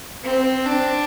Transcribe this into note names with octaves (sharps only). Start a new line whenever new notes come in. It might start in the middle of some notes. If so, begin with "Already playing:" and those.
C4
D4